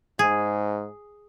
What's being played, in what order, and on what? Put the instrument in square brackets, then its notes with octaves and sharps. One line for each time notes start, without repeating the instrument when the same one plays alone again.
[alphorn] G#2 [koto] G#4